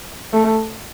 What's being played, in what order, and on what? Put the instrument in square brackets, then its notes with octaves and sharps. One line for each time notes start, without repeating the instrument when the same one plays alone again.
[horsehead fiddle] A3